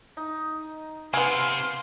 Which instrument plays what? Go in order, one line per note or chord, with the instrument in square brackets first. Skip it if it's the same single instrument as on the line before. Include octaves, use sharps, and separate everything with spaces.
[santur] D#4
[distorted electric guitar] C3 [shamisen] B3 G#4 [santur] F5 E6 [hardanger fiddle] C6